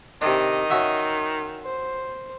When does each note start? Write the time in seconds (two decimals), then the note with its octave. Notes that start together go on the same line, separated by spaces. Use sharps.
0.22 C3 D#3 D4 D#5
0.70 C#4 F#4 E5
1.64 C5